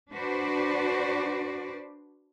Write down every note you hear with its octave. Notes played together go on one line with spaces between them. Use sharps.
D4 F#4 B4 C5 D5